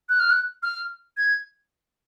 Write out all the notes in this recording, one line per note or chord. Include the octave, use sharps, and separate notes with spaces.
F#6
F6
F#6
F6
G#6